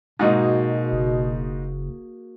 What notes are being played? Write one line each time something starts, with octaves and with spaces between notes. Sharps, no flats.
G#2 B2 A#3 D#4 F#4 G#4
F#1